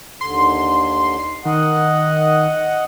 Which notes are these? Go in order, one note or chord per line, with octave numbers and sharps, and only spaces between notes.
D#2 D3 C6
D#3 D#5 F#5